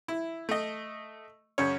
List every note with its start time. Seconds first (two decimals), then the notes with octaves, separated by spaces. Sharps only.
0.08 E4
0.49 A3 D#5
1.58 F#2 C#3 C#5